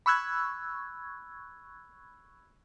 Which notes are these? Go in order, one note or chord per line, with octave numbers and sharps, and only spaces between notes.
B5 C#6 E6 F#6 G#6